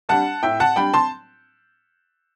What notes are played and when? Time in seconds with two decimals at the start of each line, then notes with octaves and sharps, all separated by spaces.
0.09 G3 D4 F#5 A5
0.43 A2 E5 G5
0.60 F#5 A5
0.76 G3 D4 G5 B5
0.94 A5 C6